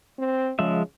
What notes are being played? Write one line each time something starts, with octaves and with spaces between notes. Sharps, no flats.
C4
C#3 F3 G#3 E5